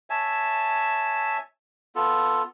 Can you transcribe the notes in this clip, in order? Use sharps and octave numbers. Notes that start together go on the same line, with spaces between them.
C#5 E5 G#5 A5
B3 F4 A4